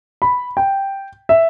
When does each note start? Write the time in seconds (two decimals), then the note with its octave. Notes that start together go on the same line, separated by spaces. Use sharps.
0.22 B5
0.57 G5
1.29 E5